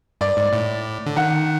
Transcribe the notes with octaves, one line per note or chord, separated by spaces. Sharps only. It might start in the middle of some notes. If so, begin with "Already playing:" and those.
G2 D5
G#2
A2
D3
D#3 F#5